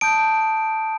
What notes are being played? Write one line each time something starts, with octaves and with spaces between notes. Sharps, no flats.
A5 D#6 G6 D7